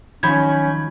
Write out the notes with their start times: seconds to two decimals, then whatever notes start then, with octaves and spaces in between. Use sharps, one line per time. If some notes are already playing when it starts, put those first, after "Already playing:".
0.23 D#3 F3 F#3 C#4 B5 G6 G#6